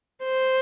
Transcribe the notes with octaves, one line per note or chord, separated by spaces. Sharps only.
C5